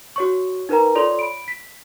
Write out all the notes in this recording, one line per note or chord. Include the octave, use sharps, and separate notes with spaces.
F#4 C#5 C#6
D#4 A#4 B4 G5 A#5
F4 A4 C#5 D5 C6 F7
B5 D7
B6